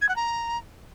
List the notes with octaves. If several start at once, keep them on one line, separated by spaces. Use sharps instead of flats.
G#6
F#5
A#5